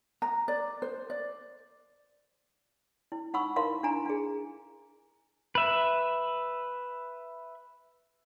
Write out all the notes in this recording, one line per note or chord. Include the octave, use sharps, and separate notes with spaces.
A#5
D5
C5
D5
E4
D#4 F#5 B5 C#6 E6
E4 A#4 F5 C6
D4 E4 G#5 A#5
D4 G#4
B4 E5